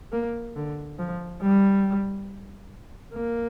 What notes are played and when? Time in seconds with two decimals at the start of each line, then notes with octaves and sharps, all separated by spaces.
0.12 A#3
0.56 D3
0.99 F3
1.42 G3
3.14 A#3